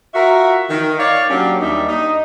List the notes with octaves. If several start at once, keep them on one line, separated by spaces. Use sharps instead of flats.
F4 F#4 A#4 E5
D#3
C#5 D5 F5
F#3 A#3 C#4 D4 G4
D#2 G3 D4 D#4 D#5 E5
D#4